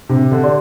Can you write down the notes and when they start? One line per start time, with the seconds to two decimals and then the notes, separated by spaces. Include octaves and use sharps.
0.09 C3 D4
0.32 D3
0.44 G4 D5 C6